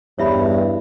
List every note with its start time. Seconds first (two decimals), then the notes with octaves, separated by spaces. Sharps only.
0.19 E2 G2 C#5 E5 B5